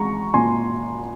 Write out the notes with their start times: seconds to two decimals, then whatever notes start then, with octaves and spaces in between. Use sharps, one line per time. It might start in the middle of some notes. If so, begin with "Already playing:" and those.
Already playing: G#3 A#5 C#6
0.34 A#2 G#5 C6